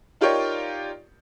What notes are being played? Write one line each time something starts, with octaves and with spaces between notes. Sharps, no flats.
D#4 F4 G4 A#4 C#5 D5